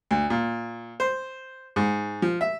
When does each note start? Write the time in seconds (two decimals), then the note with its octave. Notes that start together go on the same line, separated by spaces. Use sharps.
0.11 D2
0.30 A#2
1.00 C5
1.76 G#2
2.22 F3
2.41 E5